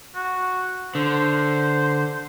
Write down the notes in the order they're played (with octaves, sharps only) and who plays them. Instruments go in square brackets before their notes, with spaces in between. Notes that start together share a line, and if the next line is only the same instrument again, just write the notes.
[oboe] F#4
[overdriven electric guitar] D3 [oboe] C5